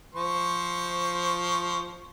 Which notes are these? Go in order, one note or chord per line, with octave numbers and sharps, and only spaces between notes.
F3 C5 C#6